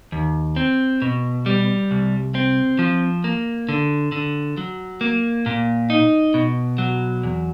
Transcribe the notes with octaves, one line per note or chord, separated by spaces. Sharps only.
D#2
C4
B2
G3
C2
C4
F3
A#3
D3
D3
F#3
A#3
A#2
D#4
B2
F#3
E2